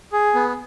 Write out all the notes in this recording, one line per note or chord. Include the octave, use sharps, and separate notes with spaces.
G#4
B3